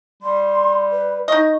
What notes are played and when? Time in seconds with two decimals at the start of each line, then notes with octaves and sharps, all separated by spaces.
0.23 G3 C6
0.92 B4
1.28 D#4 D#5 C#6